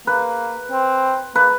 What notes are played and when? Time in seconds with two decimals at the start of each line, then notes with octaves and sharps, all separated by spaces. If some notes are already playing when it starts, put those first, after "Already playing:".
0.07 A#3 B4
0.71 C4
1.35 A#3 B4